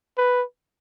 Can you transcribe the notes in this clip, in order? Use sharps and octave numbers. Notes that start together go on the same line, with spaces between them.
B4